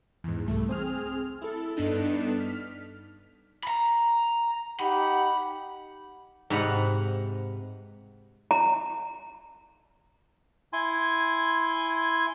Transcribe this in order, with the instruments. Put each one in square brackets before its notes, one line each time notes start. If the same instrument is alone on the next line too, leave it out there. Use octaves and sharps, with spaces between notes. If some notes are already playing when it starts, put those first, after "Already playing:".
[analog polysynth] E2 G#2
C2 A3
C4 G#4 F6
E4 A4
G2 B3 D4 D#4 A4
F6 B6
[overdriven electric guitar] A#5 B5
[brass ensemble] D#4 G4 F#5 [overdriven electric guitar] B5
[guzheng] G#2 C3 B4 F5 F#5
[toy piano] A#5
[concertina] E4 G#5 C6